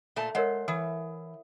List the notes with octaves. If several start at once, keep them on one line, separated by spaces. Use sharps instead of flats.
A#2 A3 A5
G#3 A#4 C#5 F#5
E3 D#6